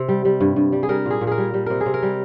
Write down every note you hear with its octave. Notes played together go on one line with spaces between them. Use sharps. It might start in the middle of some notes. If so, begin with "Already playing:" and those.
Already playing: C3
G3
G3
G2
G2
G3
G#4
G3 A#4
A#2
G#4
A#2
G#4 A#4
G3
G3
C3 A#4
G#4
C3
A#4
G3